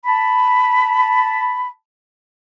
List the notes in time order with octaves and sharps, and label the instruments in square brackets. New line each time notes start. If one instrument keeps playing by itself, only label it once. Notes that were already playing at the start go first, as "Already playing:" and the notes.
[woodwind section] A5 B5